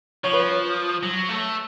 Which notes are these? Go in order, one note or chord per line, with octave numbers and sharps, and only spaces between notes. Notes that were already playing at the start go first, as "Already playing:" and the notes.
F3 C#5
B4
C#5
F#3
A3